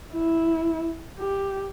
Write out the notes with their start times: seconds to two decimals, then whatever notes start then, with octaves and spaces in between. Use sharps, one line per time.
0.13 E4
1.19 G4